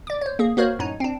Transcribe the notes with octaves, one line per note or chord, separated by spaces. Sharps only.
D5 D6
C5 C#5
A#3 G#4
A#3 F#4 A#4 C5 C#5
F#2 A2 D#4 C#5
C4 D4